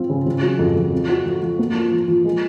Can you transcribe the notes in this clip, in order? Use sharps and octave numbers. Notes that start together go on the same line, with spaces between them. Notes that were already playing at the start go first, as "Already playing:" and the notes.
Already playing: F3 C4 F4
C#3
C#3
F#3
F2
F2
C4
F#4
F3
F3
A#3
F4
F3
F3
G#3